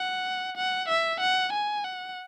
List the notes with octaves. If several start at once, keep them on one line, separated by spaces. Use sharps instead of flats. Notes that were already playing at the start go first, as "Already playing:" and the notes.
Already playing: F#5
F#5
E5
F#5
G#5
F#5